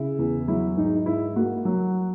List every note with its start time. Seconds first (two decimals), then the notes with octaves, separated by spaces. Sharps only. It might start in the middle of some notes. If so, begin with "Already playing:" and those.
Already playing: C#3 E4
0.19 E2
0.48 F#3 E4
0.77 G#2 D#4
1.06 G#2 E4
1.36 A#3 F#4
1.65 F#3